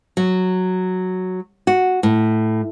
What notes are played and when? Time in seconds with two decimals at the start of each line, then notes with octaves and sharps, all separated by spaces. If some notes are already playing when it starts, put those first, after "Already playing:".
0.17 F#3
1.67 F#4
2.03 A2